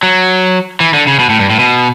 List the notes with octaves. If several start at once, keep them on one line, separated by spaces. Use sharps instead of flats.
F#3
E3
D3
C#3
B2
A2
G2
A2
B2